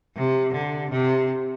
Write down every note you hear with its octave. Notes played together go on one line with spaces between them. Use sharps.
C3
D3
C3